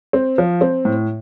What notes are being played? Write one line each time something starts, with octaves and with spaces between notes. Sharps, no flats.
C4
F3
C4
A2